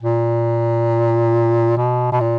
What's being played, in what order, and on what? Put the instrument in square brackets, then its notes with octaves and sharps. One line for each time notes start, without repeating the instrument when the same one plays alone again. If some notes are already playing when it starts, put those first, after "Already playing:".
[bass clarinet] A#2
B2
B2
A#2